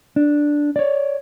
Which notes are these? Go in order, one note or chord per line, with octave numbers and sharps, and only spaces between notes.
D4
C#5 D5